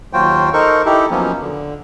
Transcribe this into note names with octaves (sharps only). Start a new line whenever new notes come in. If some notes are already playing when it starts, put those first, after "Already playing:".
D#2 F#3 F4 F#4 C5 G5
D#4 A4 A#4 C5 C#6
D#4 E4 G4 A4
F3 F#3 A#3 B3 C#4
D3